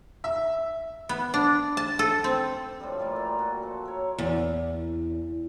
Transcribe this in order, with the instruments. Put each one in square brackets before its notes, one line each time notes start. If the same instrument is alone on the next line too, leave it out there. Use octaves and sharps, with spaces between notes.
[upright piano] E5
[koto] B3
D4
A5
A4
C4
[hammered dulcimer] A2 D3 F3 G3
E3 G3 A#3 F4
A#2
F#4
F3 A4
A#4 C#5
[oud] E2